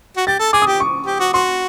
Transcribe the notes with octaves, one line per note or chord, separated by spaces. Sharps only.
F#4
G4 A6
A4
G#4 D6
D#6
G4
C#6
G4
F#4
F#4 C6